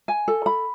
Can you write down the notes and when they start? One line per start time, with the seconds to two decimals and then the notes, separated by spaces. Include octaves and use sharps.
0.08 G#5
0.28 A4
0.46 B5